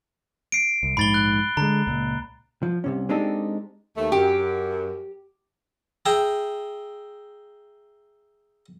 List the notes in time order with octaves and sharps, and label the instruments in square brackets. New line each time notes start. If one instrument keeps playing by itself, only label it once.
[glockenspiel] C7 D7
[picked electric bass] C2
[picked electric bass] A#1 G#2 [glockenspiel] B5 A6 G7
[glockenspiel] F#6
[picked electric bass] D3 G#3 [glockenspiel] A#5
[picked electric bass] C#2 A#2
[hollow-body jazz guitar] F3
C2 C3 C#4
G#3 C4 D4 D#4 G4 A4
[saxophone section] D#2 A3
[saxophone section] F#2 [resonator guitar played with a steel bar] G4
[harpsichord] G#4 E5 G5 A#5